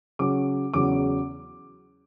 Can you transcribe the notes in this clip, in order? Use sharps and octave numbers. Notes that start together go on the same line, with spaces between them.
C#3 F#3 C#4 D6
E2 C#3 F#3 D6